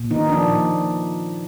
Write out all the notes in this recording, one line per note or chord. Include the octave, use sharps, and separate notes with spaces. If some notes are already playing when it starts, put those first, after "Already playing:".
Already playing: A#2
D#3 B3 D#4
F3 D4
A#2
A#2